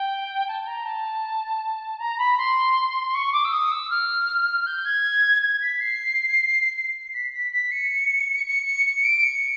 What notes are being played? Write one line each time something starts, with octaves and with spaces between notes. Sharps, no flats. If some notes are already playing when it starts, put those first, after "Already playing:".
Already playing: G5
A5
A#5
A5
A#5
B5
C6
C#6
D6
E6
D#6
E6
F6
G6
G#6
G#6
B6
C7
B6
B6
B6
C#7
C#7
C#7
C#7
D7
C#7